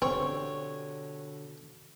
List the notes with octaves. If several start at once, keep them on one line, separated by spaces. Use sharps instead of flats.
B2 D3 C4 G4 C#5